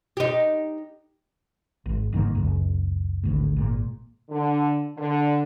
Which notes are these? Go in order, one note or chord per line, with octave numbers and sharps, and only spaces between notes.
D#4 G4
G#1
G1 G#2 D#3 A#3
F#1 C#2
G#1 D2 A2
G#1 A#2
D3
D3